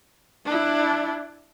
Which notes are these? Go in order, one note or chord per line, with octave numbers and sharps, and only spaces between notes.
D4 E4